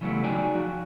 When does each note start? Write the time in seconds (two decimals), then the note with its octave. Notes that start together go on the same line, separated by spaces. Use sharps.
0.01 C#3 E3 F#3 G3 A3 B3
0.24 D#4 F#4 G#4 D5 G5 G#5
0.55 F3 F#4